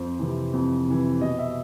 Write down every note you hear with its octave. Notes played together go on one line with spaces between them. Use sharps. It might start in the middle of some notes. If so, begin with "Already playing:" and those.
Already playing: F2 C5
C3 E3
F2
C3 E3
B2 D#5
E5